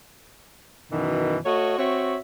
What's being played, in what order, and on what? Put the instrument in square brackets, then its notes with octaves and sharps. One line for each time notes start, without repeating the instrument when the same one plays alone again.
[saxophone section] F#2 B2 D#3 E3
A3 F#4 C#5 D#5
C4 F#4 C#5 E5